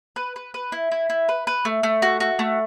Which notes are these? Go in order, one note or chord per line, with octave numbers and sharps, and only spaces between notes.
B4
B4
B4
E4
E4
E4
B4
B4
A3
A3
F#4
F#4
A3